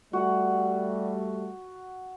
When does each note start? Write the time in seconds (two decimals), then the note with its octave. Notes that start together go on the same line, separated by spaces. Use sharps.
0.13 G3 A3 F#4 F#5